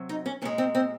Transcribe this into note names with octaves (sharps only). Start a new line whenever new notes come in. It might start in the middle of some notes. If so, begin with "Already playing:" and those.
Already playing: C3 F#3
D#4
C#4
A#2 G#3 C#4
C4
C4